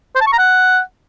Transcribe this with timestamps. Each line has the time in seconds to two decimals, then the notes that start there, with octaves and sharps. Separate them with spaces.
0.15 C5
0.21 A5
0.27 C#6
0.33 A#5
0.38 F#5